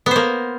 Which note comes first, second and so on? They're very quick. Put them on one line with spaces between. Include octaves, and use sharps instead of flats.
B3 C5 A#3